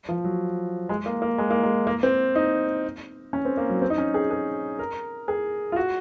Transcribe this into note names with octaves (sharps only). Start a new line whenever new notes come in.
F3
F#3
G#3
A#3
A#3
G#3
A#3
G#3
A#3
C4
D#4
C#4
C4
A#3
F#3
C4
D#4
C#4
G#4
G#4
A#4
G#4
F4
F#4